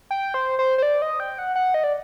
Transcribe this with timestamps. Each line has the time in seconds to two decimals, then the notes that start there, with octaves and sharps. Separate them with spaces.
0.11 G5
0.34 C5
0.59 C5
0.78 C5
0.83 D5
1.02 D#5
1.20 G5
1.38 F#5
1.56 F#5
1.74 D#5
1.84 D5